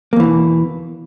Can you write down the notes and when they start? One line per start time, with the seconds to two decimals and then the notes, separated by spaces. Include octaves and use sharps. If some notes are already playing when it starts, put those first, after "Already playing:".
0.13 A#3
0.16 E2
0.20 E3
0.23 B2